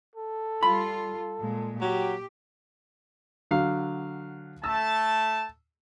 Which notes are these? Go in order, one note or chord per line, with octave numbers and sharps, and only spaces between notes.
A4
G3 F4 B5
A#2 G#3
F#3 G4
D3 F#3 F5
A3 A5 E6